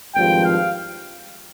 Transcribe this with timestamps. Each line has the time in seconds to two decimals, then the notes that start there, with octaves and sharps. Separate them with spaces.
0.14 G#1 G2 F3 G5
0.44 F5